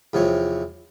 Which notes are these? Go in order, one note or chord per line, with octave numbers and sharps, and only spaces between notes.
E2 C3 F3 C#5